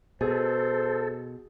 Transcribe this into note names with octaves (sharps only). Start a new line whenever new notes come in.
B2 G#4 A4 C5